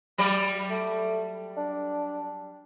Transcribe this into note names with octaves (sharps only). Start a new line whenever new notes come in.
F#3 G3 D5
A3
D4